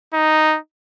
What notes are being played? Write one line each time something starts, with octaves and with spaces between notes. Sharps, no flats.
D#4